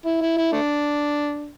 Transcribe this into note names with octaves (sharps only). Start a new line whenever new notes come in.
E4
E4
E4
A3 D4